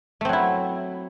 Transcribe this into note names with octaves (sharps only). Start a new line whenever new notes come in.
F#3 A3 C4 E4